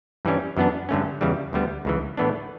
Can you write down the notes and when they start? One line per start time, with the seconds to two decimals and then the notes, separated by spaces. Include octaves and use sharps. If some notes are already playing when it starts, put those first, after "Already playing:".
0.25 G2 E3 G3 C#4
0.57 F#2 E3 B3 D4
0.89 G2 D3 A3 C#4
1.21 E2 C#3 E3 G3
1.53 D2 D3 G3 B3
1.85 C#2 C#3 E3
2.17 A2 E3 B3 D4